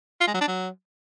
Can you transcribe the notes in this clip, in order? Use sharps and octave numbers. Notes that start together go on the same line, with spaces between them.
F4
G#3
F#3
D4
F#3